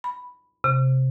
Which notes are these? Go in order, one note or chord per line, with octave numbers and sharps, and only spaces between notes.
B5
C3